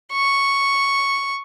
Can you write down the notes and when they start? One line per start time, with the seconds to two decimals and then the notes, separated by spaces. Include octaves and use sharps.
0.13 C#6